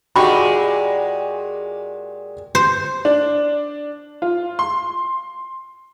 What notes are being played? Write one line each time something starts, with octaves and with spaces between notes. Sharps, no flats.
A#2 G#3 F#4 G4 B5 C#6
C5
D4
F4
C6